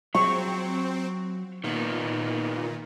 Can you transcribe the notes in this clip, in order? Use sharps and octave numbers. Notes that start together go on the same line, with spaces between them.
F#3 C4 C#6
A#2 D#3 B3